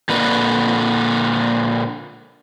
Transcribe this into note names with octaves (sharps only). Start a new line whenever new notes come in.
A#2 D3 B4